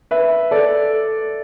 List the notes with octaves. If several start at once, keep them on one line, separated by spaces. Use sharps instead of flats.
B4 E5
A4 D5